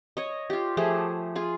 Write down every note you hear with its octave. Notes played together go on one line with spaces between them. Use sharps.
C#5 D#5
F4 G4
F3 A3 G4 G#4
F4 G#4